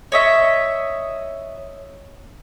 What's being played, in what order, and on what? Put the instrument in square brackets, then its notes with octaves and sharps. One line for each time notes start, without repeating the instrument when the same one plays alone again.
[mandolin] C#5 D#5 E5